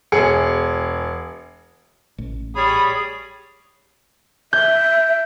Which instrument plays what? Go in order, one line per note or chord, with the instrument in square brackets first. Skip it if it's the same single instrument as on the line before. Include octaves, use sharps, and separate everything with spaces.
[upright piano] E1 G#4 C#7
[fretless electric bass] A1
[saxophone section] G3 G#4 C#5 [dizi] B5 [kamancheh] D#6
[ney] E5 [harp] G6